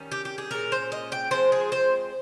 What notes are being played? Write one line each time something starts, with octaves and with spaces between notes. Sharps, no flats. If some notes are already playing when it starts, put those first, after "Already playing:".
Already playing: D#3 G3 C#4
G4
G4
G#4
A#2 G#3 C#4 A#4
C5
D#5
G5
F3 G#3 C4 C5
G#4
C5